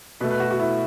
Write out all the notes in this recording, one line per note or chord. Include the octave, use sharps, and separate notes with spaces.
B2 A3 B4
B4
F#4
F#4
E4